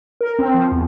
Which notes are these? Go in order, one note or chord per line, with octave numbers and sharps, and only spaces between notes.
A#4
C4
F3
E2